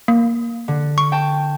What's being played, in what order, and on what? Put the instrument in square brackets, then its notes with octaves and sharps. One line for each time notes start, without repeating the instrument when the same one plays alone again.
[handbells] A#3
[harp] D3
[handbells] C#6
[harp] G5 A5